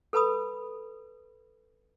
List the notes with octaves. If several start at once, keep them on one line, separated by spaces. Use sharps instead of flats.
A4 B4 A5 B5 D#6